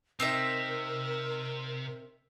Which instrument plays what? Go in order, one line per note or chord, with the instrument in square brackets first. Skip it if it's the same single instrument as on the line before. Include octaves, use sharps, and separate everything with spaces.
[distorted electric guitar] C3 [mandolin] C4 D#4 E5 [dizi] A#4